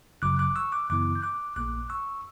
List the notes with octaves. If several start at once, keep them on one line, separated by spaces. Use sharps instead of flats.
G1 F#2 C#3 F#3 D6 F#6
D6 F#6
C#6 E6
D6 F#6
F#2 C#3 E3 B3 E4 D6 F#6
G6
D6 F#6
A#1 A#2 A#3 D6 F#6
C#6 E6